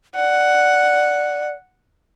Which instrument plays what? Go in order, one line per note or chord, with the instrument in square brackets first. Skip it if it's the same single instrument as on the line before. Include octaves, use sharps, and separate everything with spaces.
[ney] D5 [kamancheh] F#5